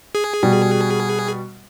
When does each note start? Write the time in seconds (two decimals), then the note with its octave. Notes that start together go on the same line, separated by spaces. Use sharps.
0.15 G#4
0.43 B2 G3